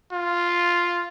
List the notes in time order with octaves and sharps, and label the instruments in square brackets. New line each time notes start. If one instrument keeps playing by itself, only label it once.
[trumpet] F4